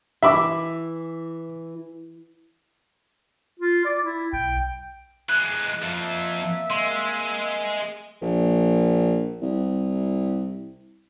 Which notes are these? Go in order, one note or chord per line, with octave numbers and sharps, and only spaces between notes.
E3 E5 B5 D6
F4
D5
E4
B1 G5
E3 G#3 F#6
F2 F3 A#3 C4 E5
G#3 C6
A#1
C2